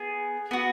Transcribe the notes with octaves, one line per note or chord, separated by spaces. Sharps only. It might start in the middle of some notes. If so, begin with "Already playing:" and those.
Already playing: B3 G#4
B3 F#4